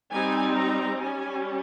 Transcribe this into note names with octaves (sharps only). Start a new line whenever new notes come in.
G3 C4 D#4 G#5
A#5
G3 C#4 G#5